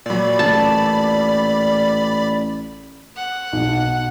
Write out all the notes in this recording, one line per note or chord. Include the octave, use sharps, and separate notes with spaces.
A#2 F#3 D5 B5
A1 A5
F#5
B1